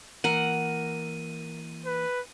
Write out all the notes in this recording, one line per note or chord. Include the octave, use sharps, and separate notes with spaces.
E3 A#3 A#4 F#5 D#7
B4